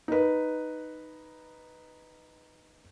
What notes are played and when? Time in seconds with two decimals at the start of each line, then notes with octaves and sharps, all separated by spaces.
0.08 D#4 B4